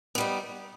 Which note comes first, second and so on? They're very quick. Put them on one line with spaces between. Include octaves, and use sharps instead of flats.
B3 G3 D#4